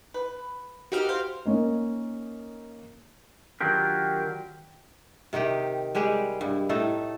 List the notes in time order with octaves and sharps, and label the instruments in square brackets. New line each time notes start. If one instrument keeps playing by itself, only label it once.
[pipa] B4
[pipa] A#3 D#4 [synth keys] F#4 G4 F6
[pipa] C5 [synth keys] F5
[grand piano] A#3 C#4 D#4 D#5
[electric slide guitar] D#3 F#3 D4 F4 G4 A#4
[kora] C3 D#3 D#4 G4
G3 G#3 G4 G#4
G2
A2 A3 D#4 A4